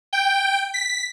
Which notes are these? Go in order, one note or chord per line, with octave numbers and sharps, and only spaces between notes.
G5
B6